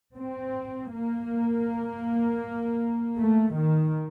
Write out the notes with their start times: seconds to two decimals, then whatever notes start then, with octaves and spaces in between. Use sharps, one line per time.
0.17 C4
0.92 A#3
3.18 A3
3.55 D#3